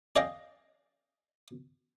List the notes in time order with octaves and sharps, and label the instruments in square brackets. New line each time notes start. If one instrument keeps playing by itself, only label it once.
[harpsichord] G#4 D5 D#5 F5 G5